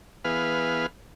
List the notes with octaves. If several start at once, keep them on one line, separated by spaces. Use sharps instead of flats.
E3 B3 G#4 B4 F5 F6